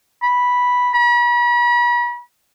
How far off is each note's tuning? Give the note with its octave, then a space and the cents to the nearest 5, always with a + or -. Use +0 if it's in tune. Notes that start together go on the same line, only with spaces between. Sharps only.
B5 -5
B5 -40